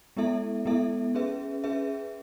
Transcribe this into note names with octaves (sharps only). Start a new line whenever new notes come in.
G#3 B3 E4 A4 E5
G#3 B3 E4 A4 E5
C#4 G#4 B4 E5
C#4 G#4 B4 E5